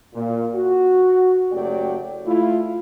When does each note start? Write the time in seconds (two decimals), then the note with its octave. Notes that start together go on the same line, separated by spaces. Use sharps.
0.14 A#2
0.54 F#4
1.52 F#1 F#3 A3 G4 D5 G5
2.26 A3 E4 F4